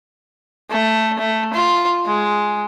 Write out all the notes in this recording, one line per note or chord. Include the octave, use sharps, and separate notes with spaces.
A3
A3
F4
G#3